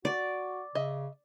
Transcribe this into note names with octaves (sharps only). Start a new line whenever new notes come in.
F#4 D5
C#3 D#5 E5